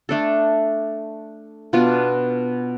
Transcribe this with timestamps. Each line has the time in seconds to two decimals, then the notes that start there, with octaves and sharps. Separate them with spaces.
0.09 A3 D4 A4
1.73 B2 B3 D4 F4